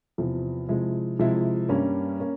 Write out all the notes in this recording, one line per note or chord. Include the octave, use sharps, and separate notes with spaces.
E2 C3 F3
C3 F3 G#3 E4
C3 F3 G#3 E4
G2 G3 A#3 C#4
A#3 C#4